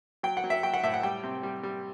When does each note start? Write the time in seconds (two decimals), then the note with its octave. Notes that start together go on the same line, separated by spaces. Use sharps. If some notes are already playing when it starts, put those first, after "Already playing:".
0.23 F#3 G5
0.37 F#5
0.44 F#3
0.50 E5
0.63 F#3 G5
0.74 F#5
0.84 A2 E5
0.94 F#5
1.03 G3 G5
1.23 C3
1.43 G3
1.63 G3